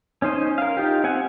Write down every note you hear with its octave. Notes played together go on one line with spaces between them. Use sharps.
C#4 D#4 C5 D#5
A#4 F5
D#4 F4 G4
C4 F#5 G#5